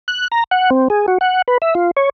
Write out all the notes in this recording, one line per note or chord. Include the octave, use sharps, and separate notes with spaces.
F#6
A#5
F#5
C4
G#4
F#4
F#5
B4
E5
F4
C#5